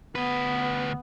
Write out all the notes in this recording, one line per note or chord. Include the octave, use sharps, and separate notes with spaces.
D2 B3 B4